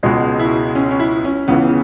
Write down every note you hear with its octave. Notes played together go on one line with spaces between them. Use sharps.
C#2 B2 G#3 F#4
E4
C#4
C#4
E4
C#4
C#2 C#3 E3 B3